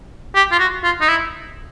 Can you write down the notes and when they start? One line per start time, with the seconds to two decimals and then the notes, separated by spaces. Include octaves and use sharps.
0.35 G4
0.51 F4
0.59 F#4
0.83 F4
1.01 D#4
1.08 E4